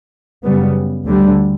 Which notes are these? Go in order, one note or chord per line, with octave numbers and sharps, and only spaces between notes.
F#2 C#3 G3 B3
D2 D3 G3